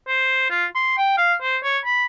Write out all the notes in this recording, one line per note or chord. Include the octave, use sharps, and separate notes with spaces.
C5
F4
C6
G5
F5
C5
C#5
B5